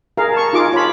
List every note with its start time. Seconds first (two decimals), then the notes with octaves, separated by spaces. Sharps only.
0.17 G#4 A#4 F5
0.33 A5 C#6
0.53 D#4 F4 G#4 D6
0.72 F4 C#5 A5 B5